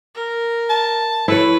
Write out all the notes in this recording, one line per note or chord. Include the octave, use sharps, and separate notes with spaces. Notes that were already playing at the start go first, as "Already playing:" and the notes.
A#4
A5
E4 A4 B4 C#5